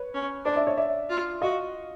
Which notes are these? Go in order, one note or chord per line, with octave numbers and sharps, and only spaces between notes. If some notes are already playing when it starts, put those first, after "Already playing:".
Already playing: B4 C#5
C#4
D4 C5 D5
D5 E5
C#5 D#5
D5 E5
F4
F#4 D#5 F5